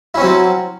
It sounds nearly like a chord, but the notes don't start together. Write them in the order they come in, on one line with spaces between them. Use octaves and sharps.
E4 C#4 C4 F#3